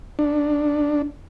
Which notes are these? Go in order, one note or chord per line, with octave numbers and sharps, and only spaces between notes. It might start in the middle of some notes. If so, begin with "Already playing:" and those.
D4